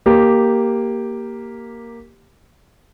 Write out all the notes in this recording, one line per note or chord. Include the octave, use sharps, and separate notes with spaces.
A#3 G4